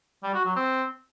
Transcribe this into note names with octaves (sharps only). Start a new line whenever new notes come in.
G3
F#4
F#3
C4